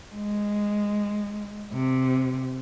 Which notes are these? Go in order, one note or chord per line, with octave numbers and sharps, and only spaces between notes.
G#3
C3